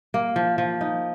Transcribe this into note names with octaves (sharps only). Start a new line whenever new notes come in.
A#3
F3
F3
D#4